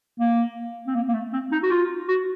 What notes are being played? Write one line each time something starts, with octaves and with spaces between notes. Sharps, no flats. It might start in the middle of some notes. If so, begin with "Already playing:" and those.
A#3
C4
A#3
A#3
A3
C4
D#4
F#4
F4
F#4